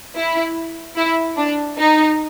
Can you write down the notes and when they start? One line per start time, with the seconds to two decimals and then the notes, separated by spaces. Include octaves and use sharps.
0.15 E4
0.96 E4
1.37 D4
1.77 D#4